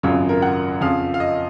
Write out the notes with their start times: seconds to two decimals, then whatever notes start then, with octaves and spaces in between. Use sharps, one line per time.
0.03 G#1 F#2 C#3 F#3 F4
0.29 A#4
0.42 F#5
0.81 F2 C#3 F3 F5
1.14 F5
1.20 D#5